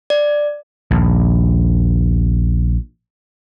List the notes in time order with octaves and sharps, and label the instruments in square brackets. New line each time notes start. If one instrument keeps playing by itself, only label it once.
[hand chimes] D5
[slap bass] A#1 D#2